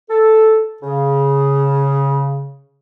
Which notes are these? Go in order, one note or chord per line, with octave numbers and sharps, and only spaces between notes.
A4
C#3